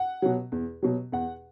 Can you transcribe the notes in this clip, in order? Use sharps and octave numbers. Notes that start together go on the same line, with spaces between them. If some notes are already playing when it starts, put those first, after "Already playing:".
Already playing: F#5
B2 F#3
E2
B2 F#3
E2 F#5